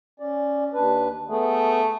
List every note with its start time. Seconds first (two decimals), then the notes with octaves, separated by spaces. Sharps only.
0.20 C#4 D5
0.73 D#2 D4 B4
1.30 A3 B3 G#4